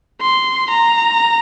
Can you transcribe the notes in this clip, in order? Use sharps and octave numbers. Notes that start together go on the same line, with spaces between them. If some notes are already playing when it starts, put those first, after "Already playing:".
C6
A#5